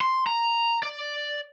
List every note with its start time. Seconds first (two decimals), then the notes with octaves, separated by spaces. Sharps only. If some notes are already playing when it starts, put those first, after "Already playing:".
0.01 C6
0.27 A#5
0.83 D5